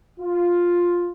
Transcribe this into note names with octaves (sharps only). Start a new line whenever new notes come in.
F4